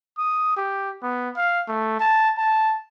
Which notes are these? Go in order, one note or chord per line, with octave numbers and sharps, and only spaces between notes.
D#6
G4
B3
F5
A3
A5
A5